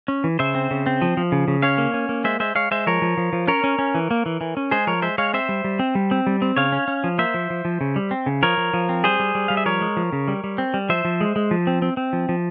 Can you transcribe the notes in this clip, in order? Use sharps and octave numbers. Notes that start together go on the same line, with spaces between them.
C#4
E3
C#3 C5 E5
C4
C#3
C4
F3
F3
C#3
C#3
C#4 C#5 F5
A#3
C#4
A#3
G#3 C5 E5
G#3 C5 E5
G#3 C#5 F5
G#3 C5 E5
F3 A#4 C#5
F3
F3
F3
C#4 A#4 C#5
C#4
C#4
E3
A#3
E3
E3
C#4
G#3 G#4 C5
F3 A#4 C#5
G#3 C5 E5
G#3 C#5 F5
C4 C5 E5
G3
G3
C4
G3
C4
G3
C4
C#3 C#5 F5
C#4
C#4
F3
A#3 C5 E5
F3
F3
F3
C#3
G3
C4
C#3
F3 A#4 C#5
F3
F3
C4
G3 G#4 C5
G3
G3
G3 F5
E5
F3 A#4 C#5
G#3
F3
C#3
G3
G3
C4
G3
F3 C5 E5
F3
G#3
G#3
F3
C4
C4
C4
F3
F3